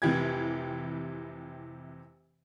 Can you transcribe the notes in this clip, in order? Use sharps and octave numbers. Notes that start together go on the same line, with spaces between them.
F1 C3 E3 G4 G#6